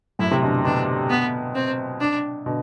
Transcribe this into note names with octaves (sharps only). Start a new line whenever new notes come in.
F#2 A2 E4
C3
B2 D3
B2 D3 D4
B3
C4
D4
B2 D3